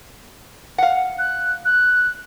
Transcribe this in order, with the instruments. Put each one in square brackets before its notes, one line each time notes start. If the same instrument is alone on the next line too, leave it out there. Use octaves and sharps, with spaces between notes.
[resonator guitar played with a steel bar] F5 F#5
[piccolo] F#6
F#6